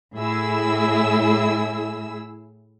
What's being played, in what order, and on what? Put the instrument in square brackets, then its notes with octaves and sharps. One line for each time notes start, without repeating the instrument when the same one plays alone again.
[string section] A2 E4 G#4 E6